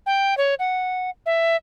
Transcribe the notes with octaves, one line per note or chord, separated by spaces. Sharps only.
G5
C#5
F#5
E5